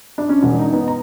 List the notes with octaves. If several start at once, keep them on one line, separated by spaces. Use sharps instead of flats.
D4
C#4
E1
D#4
B3
A#5